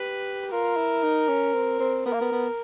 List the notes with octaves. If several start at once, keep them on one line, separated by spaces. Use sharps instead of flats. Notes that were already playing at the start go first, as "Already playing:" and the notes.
Already playing: G4 B4
F4 A#4
E4
D#4
C#4
C4
C4
B3 A#4
A#3
B3
B3